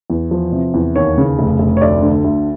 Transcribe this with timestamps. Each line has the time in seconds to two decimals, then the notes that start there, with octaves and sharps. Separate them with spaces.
0.10 E2
0.31 F3
0.52 C3
0.74 E2
0.96 D#2 C#5
1.18 C#3
1.39 F1
1.59 F1
1.77 C#5
1.81 D2 D5
2.02 D3
2.24 D2